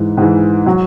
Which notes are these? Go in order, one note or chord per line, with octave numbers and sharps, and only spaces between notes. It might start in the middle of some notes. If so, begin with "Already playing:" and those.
Already playing: G#2 E3
G#2 E3
F#3